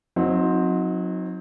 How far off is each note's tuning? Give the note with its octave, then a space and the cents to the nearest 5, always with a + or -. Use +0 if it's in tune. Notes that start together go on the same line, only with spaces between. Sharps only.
F#3 -25 C4 +5 D#4 +20